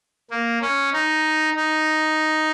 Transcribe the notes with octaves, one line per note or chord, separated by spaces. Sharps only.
A#3
C#4
D#4
D#4